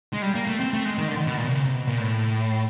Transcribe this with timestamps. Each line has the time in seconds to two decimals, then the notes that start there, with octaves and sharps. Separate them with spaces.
0.13 G#3
0.22 G3
0.35 A#3
0.47 A3
0.60 C4
0.73 A3
0.85 G#3
0.98 D#3
1.08 D3
1.17 D#3
1.27 B2
1.37 A#2
1.47 C3
1.55 C#3
1.65 C3
1.75 B2
1.88 A#2
2.00 A2